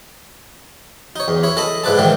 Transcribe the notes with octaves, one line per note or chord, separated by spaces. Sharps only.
D#4 C#5
E2
E4 C#5
A4 D#5 A5 B5
G#2 E4 B4 D5 A5
G#2 D#3 E3 A3